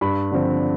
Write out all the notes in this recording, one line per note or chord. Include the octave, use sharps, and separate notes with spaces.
G2 B5
D3 F3 C4